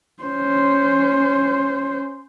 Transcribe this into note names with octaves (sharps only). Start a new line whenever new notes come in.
C#4 C5